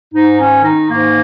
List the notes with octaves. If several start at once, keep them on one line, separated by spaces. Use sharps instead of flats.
G#2 D#4
D#3 C#4
D#3 D#4
G#2 A#3